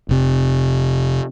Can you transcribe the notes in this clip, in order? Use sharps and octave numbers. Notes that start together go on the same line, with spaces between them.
F1 C3